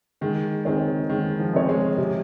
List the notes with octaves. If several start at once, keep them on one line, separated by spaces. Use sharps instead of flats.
D#3 G#3
D#3 C4 D#4 G#4 C#5
D#3 G#3
F3
C4 D#4 G#4 C#5
G#3
C3